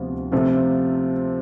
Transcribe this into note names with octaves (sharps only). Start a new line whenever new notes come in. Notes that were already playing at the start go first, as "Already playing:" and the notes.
Already playing: D2 C3 F3 B3 F4
C3 F3 A3 C4 F4